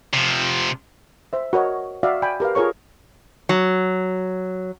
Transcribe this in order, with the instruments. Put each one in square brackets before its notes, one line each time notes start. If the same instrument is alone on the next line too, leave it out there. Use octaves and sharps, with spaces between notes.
[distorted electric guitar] C3 F3
[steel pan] C5 E5
F#4 A#4 C#5 D#5
F#4 D5 E5 F5
D5 G5 G#5 B5
G4 A#4 B4 F5
F4 G#4 A#4 C#5 C#6
[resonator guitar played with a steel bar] F#3